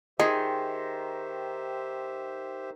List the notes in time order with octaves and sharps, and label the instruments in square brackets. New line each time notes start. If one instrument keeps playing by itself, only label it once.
[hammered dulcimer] D#3 C6 [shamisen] D#4 [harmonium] G4 C5 E5 [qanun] G#4